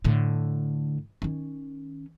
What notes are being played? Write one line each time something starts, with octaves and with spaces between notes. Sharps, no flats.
A2 D3
D#3 C#4